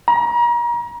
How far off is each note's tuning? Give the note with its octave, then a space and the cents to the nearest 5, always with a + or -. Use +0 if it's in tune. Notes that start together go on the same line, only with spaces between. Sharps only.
A#5 +35